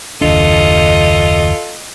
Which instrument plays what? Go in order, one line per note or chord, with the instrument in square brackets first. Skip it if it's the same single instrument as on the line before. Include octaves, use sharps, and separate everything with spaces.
[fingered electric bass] F#1 D#2 D4 [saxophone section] F4 A4 [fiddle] D#5